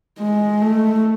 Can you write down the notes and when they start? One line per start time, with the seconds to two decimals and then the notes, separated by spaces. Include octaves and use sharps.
0.19 G#3
0.61 A3